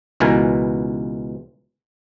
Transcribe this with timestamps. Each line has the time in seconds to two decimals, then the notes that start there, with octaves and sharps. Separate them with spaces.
0.20 C#2 B2 E3 A#4 G#5